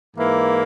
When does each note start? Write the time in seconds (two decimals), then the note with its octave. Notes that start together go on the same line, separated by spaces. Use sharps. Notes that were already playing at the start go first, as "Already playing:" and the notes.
0.15 G#2 E3 A#3 E4